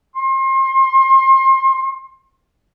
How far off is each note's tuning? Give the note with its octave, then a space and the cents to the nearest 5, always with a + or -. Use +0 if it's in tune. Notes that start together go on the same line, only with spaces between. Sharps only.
C6 +35